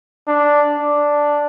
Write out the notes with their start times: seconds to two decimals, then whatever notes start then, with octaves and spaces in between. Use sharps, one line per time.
0.28 D4
0.80 D4